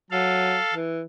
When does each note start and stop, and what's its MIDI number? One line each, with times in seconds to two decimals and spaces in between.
0.11 0.58 54
0.11 0.74 69
0.11 0.74 77
0.74 1.03 52